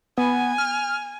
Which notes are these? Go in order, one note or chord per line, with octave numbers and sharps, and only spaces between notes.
B3 G#5
F6